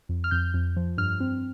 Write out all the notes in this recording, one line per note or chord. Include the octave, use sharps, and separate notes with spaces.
F2
F6
F2 G6
F2
F3
G2 F6
C4